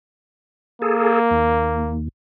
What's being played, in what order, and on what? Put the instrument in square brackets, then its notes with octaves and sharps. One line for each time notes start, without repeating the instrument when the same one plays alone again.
[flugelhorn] A#3 [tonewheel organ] G#4 A4
[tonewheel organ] D#2